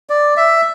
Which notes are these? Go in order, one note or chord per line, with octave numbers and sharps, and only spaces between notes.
D5
E5